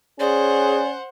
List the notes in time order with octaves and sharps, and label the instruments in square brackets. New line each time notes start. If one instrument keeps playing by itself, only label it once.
[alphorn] C#4 [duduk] G#4 [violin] C5 F#5 [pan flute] D5